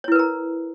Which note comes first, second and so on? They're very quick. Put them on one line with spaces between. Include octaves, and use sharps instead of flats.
C#5 E4 B4 A#4 A#5